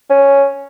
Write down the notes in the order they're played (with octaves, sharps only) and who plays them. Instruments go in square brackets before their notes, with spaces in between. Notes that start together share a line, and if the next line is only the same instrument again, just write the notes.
[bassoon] C#4